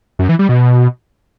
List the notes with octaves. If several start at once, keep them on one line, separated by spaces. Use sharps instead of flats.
F#2
E3
G3
B2